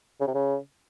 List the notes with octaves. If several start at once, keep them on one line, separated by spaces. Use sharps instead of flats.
C#3
C3
C#3